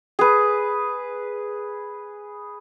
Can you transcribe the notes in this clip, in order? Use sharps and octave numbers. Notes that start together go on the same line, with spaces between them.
G#4 B4